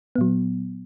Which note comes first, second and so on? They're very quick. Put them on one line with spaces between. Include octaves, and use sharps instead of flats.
B3 A#2 F#3